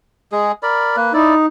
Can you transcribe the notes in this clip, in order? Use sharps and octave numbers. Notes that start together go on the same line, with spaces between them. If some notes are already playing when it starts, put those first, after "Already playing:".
G#3 G#4
A#4 D5 B5
A#3 B4
D#4 E4 D5